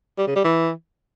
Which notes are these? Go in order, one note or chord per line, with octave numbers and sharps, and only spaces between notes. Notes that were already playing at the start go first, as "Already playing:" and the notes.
G3
C#3
G3
E3